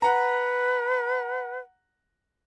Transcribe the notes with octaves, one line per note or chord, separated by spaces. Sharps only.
B4 F#5 A#5